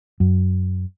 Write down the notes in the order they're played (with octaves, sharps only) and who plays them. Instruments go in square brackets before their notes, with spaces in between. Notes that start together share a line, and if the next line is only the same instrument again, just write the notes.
[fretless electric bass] F#2